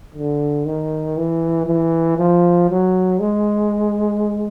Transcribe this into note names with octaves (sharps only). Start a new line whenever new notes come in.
D3
D#3
E3
E3
F3
F#3
G#3